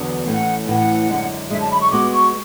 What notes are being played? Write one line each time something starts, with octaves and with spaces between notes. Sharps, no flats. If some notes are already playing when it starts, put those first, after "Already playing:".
Already playing: E2 D3 F#3 B3
A2 E3 A3 C#4 F#5
A2 E3 A3 C#4 F#5
F#2 D3 G#3
F#2 D3 G#3 E5
A5
B5
C#6
G#3 B3 F#4 B4 D6
C#6